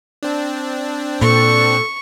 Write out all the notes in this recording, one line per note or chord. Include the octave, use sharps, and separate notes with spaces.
C4 D4
A#2 A4 C#6